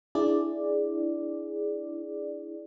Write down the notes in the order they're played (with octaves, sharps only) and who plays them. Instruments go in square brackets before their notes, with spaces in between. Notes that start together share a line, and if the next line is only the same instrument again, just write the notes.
[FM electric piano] D4 E4 G#4 D5